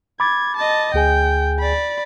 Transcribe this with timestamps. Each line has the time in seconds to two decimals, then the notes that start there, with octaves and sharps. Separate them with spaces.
0.20 B5 D6 G#6 A6
0.56 D#5 A5
0.94 D2 G#4 G5 G#5
1.59 D5 B5